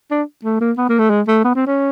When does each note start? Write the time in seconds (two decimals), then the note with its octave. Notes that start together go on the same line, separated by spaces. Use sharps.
0.11 D4
0.44 A3
0.61 A#3
0.77 B3
0.89 A#3
0.99 A3
1.10 G#3
1.28 A3
1.44 B3
1.55 C4
1.67 C#4